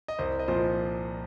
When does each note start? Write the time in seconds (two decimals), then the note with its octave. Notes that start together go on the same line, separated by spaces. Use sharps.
0.08 D#5
0.19 C2 C5
0.39 D#5
0.48 A#2 F3 C5